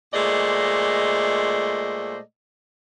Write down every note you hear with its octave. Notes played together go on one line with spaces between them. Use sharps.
A#2 G#3 A3 C5 D5 D#5